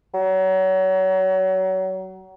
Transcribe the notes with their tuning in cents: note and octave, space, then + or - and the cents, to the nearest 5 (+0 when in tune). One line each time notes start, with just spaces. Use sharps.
F#3 +30